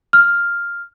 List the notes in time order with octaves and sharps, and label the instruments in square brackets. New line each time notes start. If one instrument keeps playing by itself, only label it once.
[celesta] F6